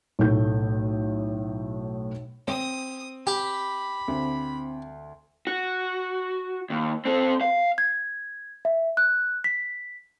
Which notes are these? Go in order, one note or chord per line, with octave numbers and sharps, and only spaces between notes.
B1 A2 A3 G6
C4 D#6
G4 B5
D2 C4
F#4
D#2
C4 A4
F5
G#6
E5
F#6
B6